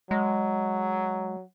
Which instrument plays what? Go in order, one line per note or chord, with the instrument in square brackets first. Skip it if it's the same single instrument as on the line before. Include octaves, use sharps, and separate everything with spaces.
[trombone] F#3 [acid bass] G#3